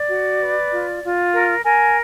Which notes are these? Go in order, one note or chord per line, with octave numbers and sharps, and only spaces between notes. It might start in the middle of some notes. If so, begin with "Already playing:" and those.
Already playing: D5
F#4
B4
F4
F4
A#4
A#4 G#5